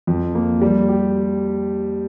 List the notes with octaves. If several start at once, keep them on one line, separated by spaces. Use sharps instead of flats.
F2
A#3
G3
G4